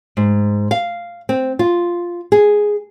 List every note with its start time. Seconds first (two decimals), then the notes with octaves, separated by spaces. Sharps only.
0.17 G#2
0.71 F5
1.29 C4
1.59 F4
2.32 G#4